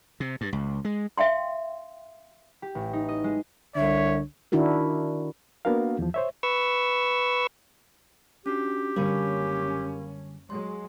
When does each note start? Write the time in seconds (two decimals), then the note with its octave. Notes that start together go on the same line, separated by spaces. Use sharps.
0.20 C3
0.41 G2
0.53 C#2
0.85 G#3
1.18 E5 F5 G5 C6
2.62 G4
2.75 A1
2.93 D#4
3.09 D#5
3.24 G#3
3.76 C2 D3 C#5 E5
4.52 D#3 D4 E4 F#4 A#4
5.65 A#3 B3 D4 F#4 A#4 F5
5.99 E2 F3
6.14 C5 C#5 E5
6.43 B4 C#6 E6
8.46 C#4 D4 F#4 G4
8.96 F#1 D3 G3 C#4 A#4 F5 B5
10.50 F#3 G#3 C6